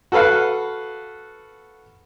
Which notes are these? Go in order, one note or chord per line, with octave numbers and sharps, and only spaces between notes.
F#4 A4 B4 F5